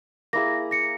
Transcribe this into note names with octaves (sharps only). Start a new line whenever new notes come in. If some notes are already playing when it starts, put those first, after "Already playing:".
A#3 E4 G#4 A#6
A#6 C#7